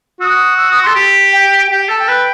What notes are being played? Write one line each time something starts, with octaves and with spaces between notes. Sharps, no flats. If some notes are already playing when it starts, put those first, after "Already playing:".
F#4 D#6 E6
E6
D#6
A4 C6
G4
G5
G4 G5
A4 A5
G5
B4